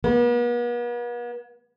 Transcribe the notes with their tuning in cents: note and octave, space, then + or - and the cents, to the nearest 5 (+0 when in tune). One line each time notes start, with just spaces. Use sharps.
B3 -45